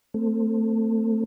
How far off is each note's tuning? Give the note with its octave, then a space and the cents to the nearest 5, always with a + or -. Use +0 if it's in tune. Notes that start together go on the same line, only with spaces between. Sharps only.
A3 +25 C4 +0